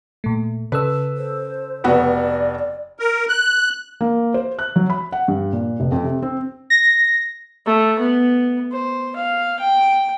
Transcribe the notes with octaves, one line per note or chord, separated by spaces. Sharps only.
A#2 A3
C#3 A4 B4 E6
C5
F1 B3 F#4 D5
A#4
F#6
A#3
C5
F#6
F#3
B5
F#5
G2
A#2
F1
F2
C3
C4
A#6
A3
B3
C5
F5
G5